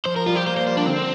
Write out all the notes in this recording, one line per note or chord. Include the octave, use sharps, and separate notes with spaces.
F3 C5
A#4
G3 F4
G4
A#3 C5
G3 C5
C5
D4
D3 C4